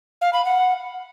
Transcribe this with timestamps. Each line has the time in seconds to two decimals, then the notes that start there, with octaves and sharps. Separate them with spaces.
0.21 F5
0.33 B5
0.45 F#5